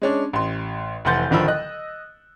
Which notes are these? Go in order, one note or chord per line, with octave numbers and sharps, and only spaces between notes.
G#3 C#4 D4
A1 C6
F1 E3 F#5 C6 G6 A6
D1 D3 D#3 F3 B5 E6
D#5 F#6